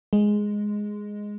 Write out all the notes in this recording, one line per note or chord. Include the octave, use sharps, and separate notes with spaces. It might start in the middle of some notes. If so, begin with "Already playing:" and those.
G#3